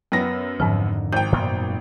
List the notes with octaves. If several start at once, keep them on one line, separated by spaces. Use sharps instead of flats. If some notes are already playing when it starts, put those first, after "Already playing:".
F#2 B3 A#6
F2 G#2 D3 D#3 F3
G#1 G5 G6
F#2 A#2 B3